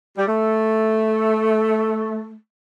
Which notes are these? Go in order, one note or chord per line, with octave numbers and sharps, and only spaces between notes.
G3
A3